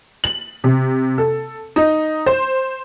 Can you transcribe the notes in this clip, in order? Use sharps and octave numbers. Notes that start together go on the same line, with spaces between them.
F#7
C3
A4
D#4
C5